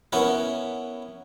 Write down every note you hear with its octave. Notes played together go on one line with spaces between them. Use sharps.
B3 C#4 E4 A#4 B4